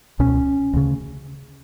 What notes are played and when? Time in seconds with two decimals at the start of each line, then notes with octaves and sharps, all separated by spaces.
0.19 C#2 B2 C#4
0.73 D2 C#3